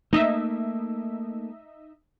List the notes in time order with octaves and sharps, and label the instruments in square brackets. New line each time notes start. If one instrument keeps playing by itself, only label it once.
[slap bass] A3 A#3 [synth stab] D#4 D#5 E5